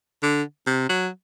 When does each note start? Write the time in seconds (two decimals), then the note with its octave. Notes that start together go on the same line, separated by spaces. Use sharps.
0.23 D3
0.66 C3
0.89 F#3